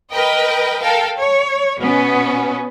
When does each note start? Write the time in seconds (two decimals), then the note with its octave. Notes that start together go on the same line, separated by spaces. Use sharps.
0.11 A#4 B4 D#5 G5
0.81 A4 A#4 F5 G5
1.18 C#5
1.80 B2 B3 C#4